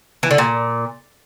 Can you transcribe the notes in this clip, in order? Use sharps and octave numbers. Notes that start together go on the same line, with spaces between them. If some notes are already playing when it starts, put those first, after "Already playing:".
E3
D3
A#2